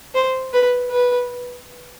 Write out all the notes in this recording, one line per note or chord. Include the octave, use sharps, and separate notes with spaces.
C5
B4
B4